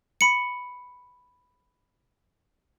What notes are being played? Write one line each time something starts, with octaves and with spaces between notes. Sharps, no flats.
B5 C#7